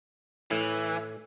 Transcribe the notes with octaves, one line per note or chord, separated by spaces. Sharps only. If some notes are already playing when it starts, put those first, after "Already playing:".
A2 E3